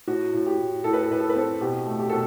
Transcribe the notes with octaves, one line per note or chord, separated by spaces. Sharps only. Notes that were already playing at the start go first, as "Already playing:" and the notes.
A2 F#4
A2
G4
A2
A2 A4
B4
A4
A2 B4
A4
B4
C4 A4
B2 G4
A3
G4
B2 A4